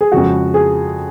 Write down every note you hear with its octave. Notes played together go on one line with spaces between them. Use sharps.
G#4
F2 C#3 G#3 F#4
G#4